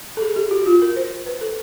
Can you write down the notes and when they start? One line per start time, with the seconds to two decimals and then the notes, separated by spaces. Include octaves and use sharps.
0.17 A4
0.22 G#4
0.36 G4
0.51 F#4
0.66 F4
0.82 A#4
0.96 C5
1.26 B4
1.41 A4